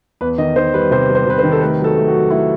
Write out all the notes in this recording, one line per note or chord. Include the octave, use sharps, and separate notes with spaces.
E2 B4
D#3 D#5
D#3 C5
G3 B4
C3 C5
G3
C5
C3 B4
C5
D#3
A4
A3 B4
F#3 A4
A3
F#4
F#3
A3 E4